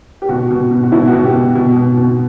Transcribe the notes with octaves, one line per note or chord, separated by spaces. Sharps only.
G4
B2 F#4
B2
B2
F#4
B2 E4
F#4
B2
G4
B2
B2
B2
B2